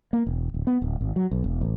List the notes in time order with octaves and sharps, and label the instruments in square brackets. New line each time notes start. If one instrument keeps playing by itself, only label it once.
[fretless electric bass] A#3
E1
D1
B3
D1
G#1
F#3
B1
E1
A1